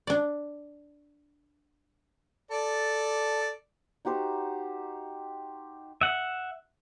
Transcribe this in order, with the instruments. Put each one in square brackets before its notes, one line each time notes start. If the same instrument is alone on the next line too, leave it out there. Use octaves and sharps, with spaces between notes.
[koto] D4 D5
[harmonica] A4 D5
[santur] D#4 F#4 G4 C5
[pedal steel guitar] E5 F#5